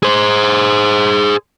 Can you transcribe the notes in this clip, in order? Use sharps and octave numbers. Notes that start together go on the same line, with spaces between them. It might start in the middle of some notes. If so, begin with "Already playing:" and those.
G#4 C5